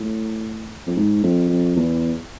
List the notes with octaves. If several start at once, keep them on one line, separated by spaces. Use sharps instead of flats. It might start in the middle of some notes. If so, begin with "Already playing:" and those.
Already playing: A2
F2
G#2
F2
F2
E2